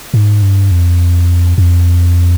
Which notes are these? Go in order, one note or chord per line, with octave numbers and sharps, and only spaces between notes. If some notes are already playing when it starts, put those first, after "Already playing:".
G#2
G2
F2
F2